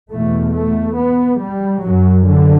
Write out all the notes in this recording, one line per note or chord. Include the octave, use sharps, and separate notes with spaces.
E2 B2 A3
A3
B3
G3
F#2 F#3
D3